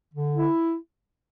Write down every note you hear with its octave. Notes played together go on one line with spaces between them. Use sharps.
D3
E4